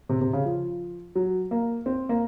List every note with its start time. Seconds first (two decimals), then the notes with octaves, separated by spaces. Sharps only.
0.09 C3
0.21 C3
0.33 C#3
0.46 F3
1.15 F#3
1.51 A#3
1.86 C4
2.09 A#3